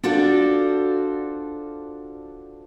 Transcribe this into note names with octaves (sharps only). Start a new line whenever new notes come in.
D4 F4 F#4 A4 C5 D5